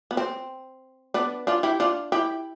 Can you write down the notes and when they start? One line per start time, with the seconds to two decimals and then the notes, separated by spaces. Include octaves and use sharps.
0.11 B3
0.17 C4
1.14 B3 D4
1.47 D4 F4
1.63 E4 G4
1.80 D4 F4
2.12 E4 G4